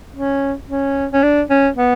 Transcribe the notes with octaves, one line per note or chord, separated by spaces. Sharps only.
C#4
C#4
C#4
D4
C#4
B3